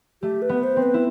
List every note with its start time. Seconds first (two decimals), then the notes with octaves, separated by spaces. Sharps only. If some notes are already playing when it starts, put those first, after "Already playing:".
0.22 A3 G4
0.42 B4
0.49 B3
0.63 C5
0.76 C4
0.82 B4
0.94 E4